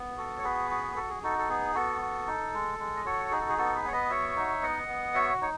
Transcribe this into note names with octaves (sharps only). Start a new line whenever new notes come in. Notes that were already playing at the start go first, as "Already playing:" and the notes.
Already playing: B3
F#4 A4
C#5
B3 G#4 B4
F#4
F#4 A4
G#4
D#4 F#4 A4
A4
B3 G#4
B3 F#4 A4
F#4
D#4
G#3
G#3
D#5
F#4 A4 C#5
D#4 G#4
A4
G#4
B3 F#4 A4
G#4 B4
B3 C#5
B4 D#5
F#4 C#5 E5
D#4
B3 D#5 F#5
B3
F#4 C#5 E5
D#4 C#5